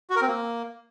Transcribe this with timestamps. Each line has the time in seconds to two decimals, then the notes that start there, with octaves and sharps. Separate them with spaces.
0.10 F#4
0.16 A#4
0.22 C4
0.28 A#3